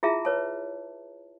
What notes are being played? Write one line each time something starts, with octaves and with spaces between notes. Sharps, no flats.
E4 F4 G#4 E5 A5 A#5
B4 C#5 A5